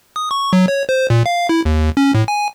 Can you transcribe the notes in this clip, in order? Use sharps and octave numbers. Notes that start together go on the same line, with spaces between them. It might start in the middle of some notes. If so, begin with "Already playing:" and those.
D#6
C#6
F#3
C#5
C5
A#2
F5
E4
D#2
C#4
A2
G#5